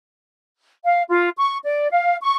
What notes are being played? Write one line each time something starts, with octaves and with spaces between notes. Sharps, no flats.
F5
F4
C#6
D5
F5
C#6